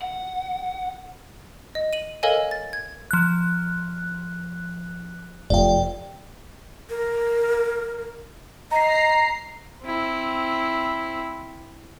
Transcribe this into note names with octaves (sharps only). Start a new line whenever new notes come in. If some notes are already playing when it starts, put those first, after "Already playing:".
F#5
D#5
D#7 F#7
A4 A#4 C#5 D#5 F5 G#5
A6
G#6
F3 F#6
F1 F2 D5 G5
A#4
D#5 A#5 C7
C4 E4